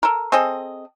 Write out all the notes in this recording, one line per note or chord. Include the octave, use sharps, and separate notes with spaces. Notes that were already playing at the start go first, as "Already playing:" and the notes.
A4 A#4
C4 G#4 A4 D#5